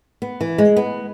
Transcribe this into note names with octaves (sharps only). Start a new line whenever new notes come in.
B3
E3
G#3
B3